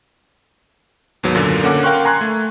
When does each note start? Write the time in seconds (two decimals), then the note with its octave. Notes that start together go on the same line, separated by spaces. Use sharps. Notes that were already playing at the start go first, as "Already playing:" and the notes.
1.23 D#2 G#2 F#3 B3
1.35 F#2 A#2 D3
1.63 D3 A#3 C#4 F#5 D6
1.83 A#4 F5 G5 C6 C#6 F#6
2.05 G#5 A#5 C6 C#6 F#6 G#6
2.21 A3